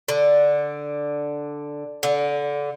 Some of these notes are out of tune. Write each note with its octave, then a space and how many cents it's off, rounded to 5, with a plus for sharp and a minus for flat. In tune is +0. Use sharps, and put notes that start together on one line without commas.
D3 +0
D3 -20